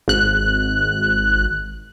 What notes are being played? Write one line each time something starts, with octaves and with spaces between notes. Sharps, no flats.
G#1 F#6